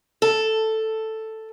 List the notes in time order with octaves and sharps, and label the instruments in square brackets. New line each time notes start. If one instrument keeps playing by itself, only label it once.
[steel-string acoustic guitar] A4